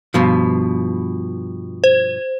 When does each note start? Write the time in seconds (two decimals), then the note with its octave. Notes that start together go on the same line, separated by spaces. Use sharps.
0.14 G2 B2 F3
1.84 C5